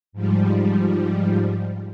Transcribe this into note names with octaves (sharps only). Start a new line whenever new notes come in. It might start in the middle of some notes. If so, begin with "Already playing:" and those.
G#2 F3 G3